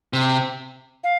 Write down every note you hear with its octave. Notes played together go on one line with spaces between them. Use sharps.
C3
F5